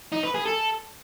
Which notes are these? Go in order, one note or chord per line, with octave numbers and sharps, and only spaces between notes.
D#4
B4
G#4
A4